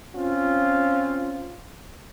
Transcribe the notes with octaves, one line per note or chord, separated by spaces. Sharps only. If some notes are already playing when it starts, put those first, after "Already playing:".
C4 C#4 F4